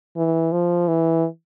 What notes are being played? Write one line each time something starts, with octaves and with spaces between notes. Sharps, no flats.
E3
F3
E3